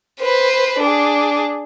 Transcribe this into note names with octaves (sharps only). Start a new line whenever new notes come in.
B4 C5
D4 G#4